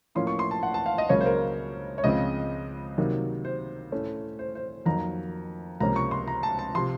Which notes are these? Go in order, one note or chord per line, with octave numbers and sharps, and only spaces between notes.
A2 F3 A#3 C#4 C6
C#6
C6
A5
F#5
A5
F5
D#5
C#2 C#3 F#3 A#3 C#4 C#5
C5
A#4
C#5
C#2 C#3 F3 C4 D#5
C3 D#3 F#3 A#3
C5
A2 A3 C#4
C5
C5
F2 D#3 F#3 A#3 A#5
C#2 C3 F3 A#3 C#4 A#5
C#6
C6
A#5
A5
A5
C3 F3 C6